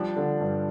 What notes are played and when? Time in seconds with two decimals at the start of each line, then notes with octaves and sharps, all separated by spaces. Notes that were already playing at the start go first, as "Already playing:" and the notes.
Already playing: F3 G3 D4
0.16 D3
0.40 G2